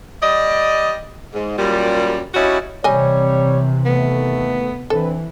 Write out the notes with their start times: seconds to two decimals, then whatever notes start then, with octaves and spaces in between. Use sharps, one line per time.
0.21 G3 D5 D#5
1.33 G#2
1.57 F#2 A#2 G3
2.34 G3 C#4 D#4 E4 F#4
2.84 C3 E3 G3 C#5 D#5 G#5
3.86 D#2 A3 B3
4.90 E3 C4 D4 A4 B4